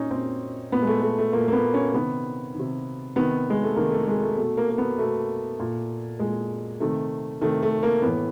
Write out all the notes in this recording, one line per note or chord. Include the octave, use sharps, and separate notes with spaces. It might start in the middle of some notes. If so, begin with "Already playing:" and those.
Already playing: A#2 C#4 D#4
A#2 C4
A#2 B3
G#3
A3
A3
A3
A#2 A#3
A#3
B3
C#4
C3 D#3 B3
C3 D#3
C3 D#3 B3
G#3
A3
C3 D#3 A#3
A3
G#3
A3
B2 A3
A#3
A#3
B3
B2 A3
A#2
A#2 G#3
C3 D#3 A3
C3 D#3 A3
A3
A#3
A2 E3 B3